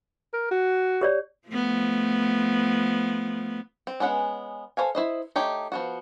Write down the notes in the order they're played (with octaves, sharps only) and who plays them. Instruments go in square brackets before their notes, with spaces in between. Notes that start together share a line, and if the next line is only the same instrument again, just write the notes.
[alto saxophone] A#4
F#4
[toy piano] G4 C#5 D5
[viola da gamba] F3 A3 B3
[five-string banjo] C4
G#3 B3 C#4 F#5
A4 C5 C#5 F5 G#5
E4 C5 D#5
A3 D#4 G4 C#5
F3 B3 F#4